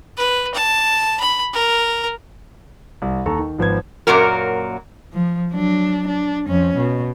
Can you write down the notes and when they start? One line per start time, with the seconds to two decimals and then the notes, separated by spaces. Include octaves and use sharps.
0.17 B4
0.54 A5
1.20 B5
1.53 A#4
3.02 C2
3.26 D#2 A4 A#5 C#6
3.39 D#3
3.59 G#1 F3 B3 G#6
4.07 F#2 A#2 F#3 A#3 F#4 A#4
5.13 F3
5.52 F#3 D4
6.08 D4
6.48 F2 C#4
6.77 B2